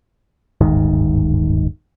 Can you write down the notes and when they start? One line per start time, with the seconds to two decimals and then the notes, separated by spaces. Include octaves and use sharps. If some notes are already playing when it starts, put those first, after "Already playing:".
0.61 D1 G1 G#2 D#3